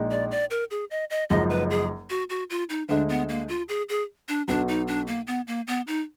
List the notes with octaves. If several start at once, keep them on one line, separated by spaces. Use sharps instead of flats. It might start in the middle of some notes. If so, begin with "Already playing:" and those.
Already playing: A#1 A#2 G#3 D#4
D5
D5
A#4
G#4
D#5
D#5
F#1 F#2 F3 G#3 D#4 D#5
B4
G#4
F#4
F#4
F4
D#4
D2 D3 G#3 D4
B3
A#3
F4
G#4
G#4
D4
B1 B2 F#3 D4
D#4
D4
A#3
B3
A#3
B3
D#4